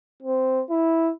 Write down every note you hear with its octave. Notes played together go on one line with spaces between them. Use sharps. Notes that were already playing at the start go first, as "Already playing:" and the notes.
C4
E4